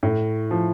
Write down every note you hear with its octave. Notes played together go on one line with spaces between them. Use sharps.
A2
F3